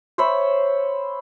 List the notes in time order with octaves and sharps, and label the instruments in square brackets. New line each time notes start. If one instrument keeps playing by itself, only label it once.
[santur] C5 C#5 E5 B5